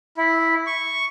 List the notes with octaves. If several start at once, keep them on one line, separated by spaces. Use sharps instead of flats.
E4
C#6